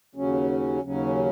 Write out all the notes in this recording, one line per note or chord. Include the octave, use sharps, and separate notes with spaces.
D#2 C#3 F#3 C#4
D#2 C#3 F#3 C#4